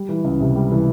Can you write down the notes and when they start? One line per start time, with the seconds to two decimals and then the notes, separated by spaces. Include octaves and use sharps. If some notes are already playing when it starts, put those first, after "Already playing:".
Already playing: G3
0.09 E3
0.24 C#2
0.40 C3
0.56 G3
0.72 E3